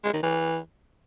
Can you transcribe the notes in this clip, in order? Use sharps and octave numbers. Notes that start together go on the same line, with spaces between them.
G#3
D#3
E3